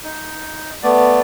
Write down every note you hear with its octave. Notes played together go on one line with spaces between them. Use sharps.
D#4
A3 B3 D5